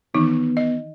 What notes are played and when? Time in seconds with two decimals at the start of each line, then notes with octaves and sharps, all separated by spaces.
0.15 D#3 E3 B3 D#4
0.57 D#5